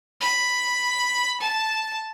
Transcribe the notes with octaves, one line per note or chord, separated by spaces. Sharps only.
B5
A5